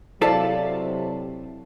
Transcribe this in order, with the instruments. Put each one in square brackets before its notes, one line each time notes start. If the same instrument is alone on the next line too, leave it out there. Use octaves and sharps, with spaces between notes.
[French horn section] C3 F#3 [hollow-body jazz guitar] E4 A4 C5 [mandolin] D5 F5 A5